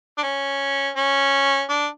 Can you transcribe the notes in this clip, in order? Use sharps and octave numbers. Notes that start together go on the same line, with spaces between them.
D4
C#4
C#4
D4